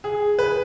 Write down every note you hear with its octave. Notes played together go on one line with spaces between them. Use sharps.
G#4
B4